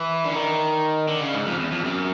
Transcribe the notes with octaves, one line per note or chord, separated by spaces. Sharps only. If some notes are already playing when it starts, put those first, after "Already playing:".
Already playing: E3
D3
D#3
D3
C#3
G#2
F2
E2
F2
F#2